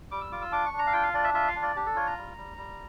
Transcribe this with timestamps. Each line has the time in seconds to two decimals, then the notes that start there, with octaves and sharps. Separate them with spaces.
0.11 G3 D6
0.21 E6
0.32 F4 D6
0.42 E6
0.52 D4 D6
0.66 C#6
0.73 D4
0.79 A#5
0.87 F5
0.93 F4 G5
1.03 F5
1.14 D4 D5
1.24 E5
1.34 F4 E5
1.48 F5
1.55 D4
1.62 D5
1.76 D4 G4
1.86 A4
1.96 F4 C#5
2.07 A#5
2.17 G3
2.37 G3
2.58 G3